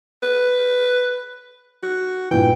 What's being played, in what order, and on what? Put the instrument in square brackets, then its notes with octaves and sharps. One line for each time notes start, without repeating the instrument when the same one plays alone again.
[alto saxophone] B4
F#4
[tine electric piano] G2 A#2 E3 [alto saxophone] G5